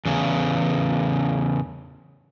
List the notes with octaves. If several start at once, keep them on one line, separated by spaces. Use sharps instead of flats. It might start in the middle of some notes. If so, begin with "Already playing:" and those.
E2 C#3